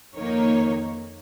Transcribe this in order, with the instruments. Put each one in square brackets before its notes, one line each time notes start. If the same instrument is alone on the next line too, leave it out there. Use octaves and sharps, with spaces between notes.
[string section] F2 D#3 A#3 D#4 C#5